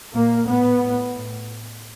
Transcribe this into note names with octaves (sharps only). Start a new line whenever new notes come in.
A#2 A#3
A2 B3
A2
A2